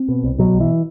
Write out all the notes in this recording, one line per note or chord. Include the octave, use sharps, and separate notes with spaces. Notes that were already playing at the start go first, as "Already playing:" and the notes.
Already playing: C4
B2
C2
B2 F#3
B1
E3